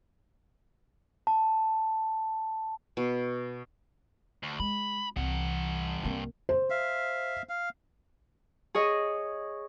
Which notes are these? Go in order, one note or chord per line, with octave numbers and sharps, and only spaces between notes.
A5
B2
D2
G#3 B5
C2 G2 E3 F#5
C2 A#3
C5
E5 F5
F5
G#4 C#5 D#5